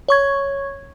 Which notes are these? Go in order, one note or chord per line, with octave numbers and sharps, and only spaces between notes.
C#5 C#6 G#6